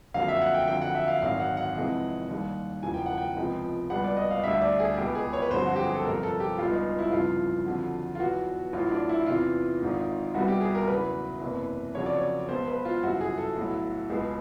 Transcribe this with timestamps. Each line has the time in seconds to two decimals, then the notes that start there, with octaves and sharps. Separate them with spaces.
0.14 F#1 F2 D3 F#3 F5
0.28 E5
0.41 F#5
0.55 G5
0.68 F2 D3 F#3 G5
0.81 F#5
0.95 E5
1.08 F5
1.22 G#1 F#2 D#3 F#3 F5
1.40 F#5
1.57 F#5
1.75 F2 C3 E3 G#3
2.29 D#2 D#3 G3
2.82 E1 E2 C#3 F3 G#5
2.94 G5
3.06 F#5
3.18 G5
3.37 C#2 C3 F3 G#3
3.90 C#2 B2 G3 F#5
4.04 D5
4.17 D#5
4.31 F5
4.44 D2 D3 G3 E5
4.61 D5
4.79 G#4
4.97 C#2 B2 G#3 G4
5.15 G#4
5.33 C#5
5.42 B4
5.51 G1 F2 D3 F#3 C5
5.66 F#4
5.76 G4
5.85 G#4
5.95 A4
6.05 G1 F2 C3 A#4
6.23 A4
6.40 G4
6.58 C#2 B2 G3 F4
6.72 D#4
6.99 E4
7.12 G1 F2 C#3 E3 F4
7.66 F2 D3 F#3
8.15 F4
8.20 E2 B2 F#3 F#4
8.73 A1 A2 F#3 F4
8.91 D4
9.09 E4
9.27 E2 C3 E3 F4
9.81 G#1 G#2 D#3
10.34 C2 B2 G3 F#4
10.48 G4
10.61 G#4
10.75 A#4
10.87 E2 C#3 F#3 B4
11.41 F#1 E2 C3 E3
11.95 F2 C#3 F#3 C#5
12.06 D5
12.16 C#5
12.49 B1 B2 G#3 C5
12.67 B4
12.85 F4
13.03 G1 F#2 C#3 E3 F#4
13.21 G#4
13.38 A4
13.56 B1 A2 F#3
14.10 C#2 B2 G#3